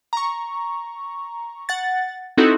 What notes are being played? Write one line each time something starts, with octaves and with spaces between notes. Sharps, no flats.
A#5 C#6
F#5 A6
C4 D#4 E4 F#4 A4